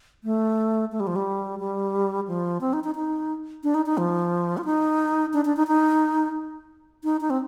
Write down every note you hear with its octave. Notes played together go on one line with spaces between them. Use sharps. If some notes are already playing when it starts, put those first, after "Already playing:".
A3
A3
G3
F3
G3
G3
F3
C4
D#4
D#4
D#4
D4
D#4
D#4
F3
F4
D#4
D4
D4
D#4
D#4
D#4
D#4
C4